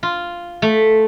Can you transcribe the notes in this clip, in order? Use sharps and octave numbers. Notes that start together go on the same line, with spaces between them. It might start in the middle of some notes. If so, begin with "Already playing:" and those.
F4
A3